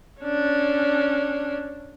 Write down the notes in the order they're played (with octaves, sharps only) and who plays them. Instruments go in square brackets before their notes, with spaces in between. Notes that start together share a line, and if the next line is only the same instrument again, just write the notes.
[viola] C#4 D4